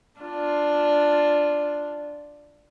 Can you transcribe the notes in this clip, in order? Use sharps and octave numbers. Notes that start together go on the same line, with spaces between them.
D4 F4